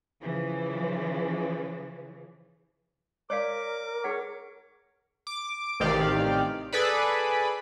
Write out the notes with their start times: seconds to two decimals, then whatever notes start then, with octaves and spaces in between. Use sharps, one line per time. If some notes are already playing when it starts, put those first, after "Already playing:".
0.20 C#3 E3 F3
3.30 A#4 C#5 D5 F5 D6
4.04 G#4 C#5 F#5
5.27 D6
5.80 A1 C3 D#3 G4 D5 F5
6.73 G#4 A4 B4 D5 B5